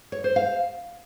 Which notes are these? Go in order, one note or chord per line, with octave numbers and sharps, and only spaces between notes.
C#5
C5
F5